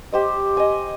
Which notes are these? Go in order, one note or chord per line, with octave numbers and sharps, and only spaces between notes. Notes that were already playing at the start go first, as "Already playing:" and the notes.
G4 C5 D#5
D#5 G#5